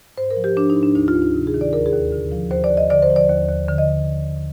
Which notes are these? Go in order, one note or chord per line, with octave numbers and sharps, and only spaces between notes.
G#2 C5
A#4
F3
G4
F3 D4
D#4
G#2
D4
D2 D#4
F4
D2
D#4
C3
G#4
D#3
D5
D#2 A#4
G#4
D#2
D3
F3
D#2 C5
D5
D#2
D#5
D3 D5
C5
F3
D5
D#2
D#2
D3
D#5